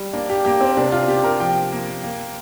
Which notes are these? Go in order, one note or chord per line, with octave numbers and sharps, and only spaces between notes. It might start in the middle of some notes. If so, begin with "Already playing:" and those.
Already playing: G3
A#3 D4
G4
A#3 G4
C4
C3 D4
F4
C3 G4
A#4
F3 G5
A#3
A#3